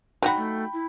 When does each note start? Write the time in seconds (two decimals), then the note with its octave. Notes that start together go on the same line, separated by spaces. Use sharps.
0.22 F#3 D#4 F#4 G5 B5
0.37 A3
0.74 E4